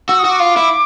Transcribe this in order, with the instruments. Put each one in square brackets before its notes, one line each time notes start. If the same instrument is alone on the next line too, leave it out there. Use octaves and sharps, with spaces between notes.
[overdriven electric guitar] F#4 [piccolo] E6
[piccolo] D#6
[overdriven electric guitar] F#4
[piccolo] D6
[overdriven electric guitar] F4
E4